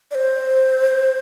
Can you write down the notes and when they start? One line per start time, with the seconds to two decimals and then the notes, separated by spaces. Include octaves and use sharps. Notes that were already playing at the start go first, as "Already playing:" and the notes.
0.11 D5
0.15 C5